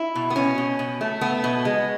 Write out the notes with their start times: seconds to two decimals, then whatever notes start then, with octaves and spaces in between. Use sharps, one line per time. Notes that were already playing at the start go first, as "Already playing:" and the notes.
Already playing: E4
0.15 B2
0.30 B3
0.36 B2 C#4
0.58 B2
0.79 B2
1.01 A3
1.21 A3 B3
1.44 B2
1.65 G#3